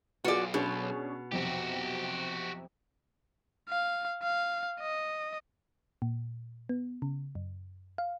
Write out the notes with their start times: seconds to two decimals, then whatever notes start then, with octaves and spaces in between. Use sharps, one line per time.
0.24 B1 B3 F4 F#4 G#4 D5
0.54 B2 C#4 D4 G#4
1.32 B1 F2 C3 F#4 G4
3.69 F5
4.23 F5
4.80 D#5
6.02 A#2
6.69 B3
7.02 C#3
7.35 F#2
7.98 F5